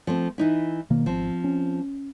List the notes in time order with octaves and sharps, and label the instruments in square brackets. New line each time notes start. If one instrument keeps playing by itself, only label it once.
[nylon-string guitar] F3 A3 C4
E3 D#4 E4
[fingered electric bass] B2 D#3 A#3
[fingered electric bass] G#1 [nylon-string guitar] F3 C4
[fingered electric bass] C#4